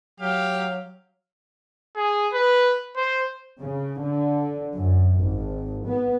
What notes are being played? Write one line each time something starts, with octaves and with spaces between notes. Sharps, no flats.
F#3 G4 F5
G#4
B4
C5
C#3
D3
F#2
G#1
B3